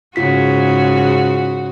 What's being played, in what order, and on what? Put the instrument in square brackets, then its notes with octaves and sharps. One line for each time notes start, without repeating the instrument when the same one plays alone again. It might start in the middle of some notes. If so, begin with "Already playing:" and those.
[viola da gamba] G#2 C#3 F#4 [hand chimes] F4 B6